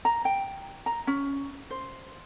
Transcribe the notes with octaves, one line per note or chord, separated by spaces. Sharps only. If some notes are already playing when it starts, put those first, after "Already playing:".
A#5
G5
A#5
C#4
C5